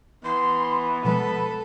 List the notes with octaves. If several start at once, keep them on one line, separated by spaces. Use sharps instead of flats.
E3 B3 C6
B2 F3 G#3 A4 B4